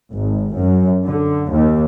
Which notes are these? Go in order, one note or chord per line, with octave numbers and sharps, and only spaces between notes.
G#1
F#2
D3
D#2